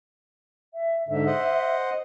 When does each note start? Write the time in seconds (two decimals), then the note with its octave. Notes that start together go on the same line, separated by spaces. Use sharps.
0.74 E5
1.09 G#2 D3 E5
1.26 C5 D#5 F#5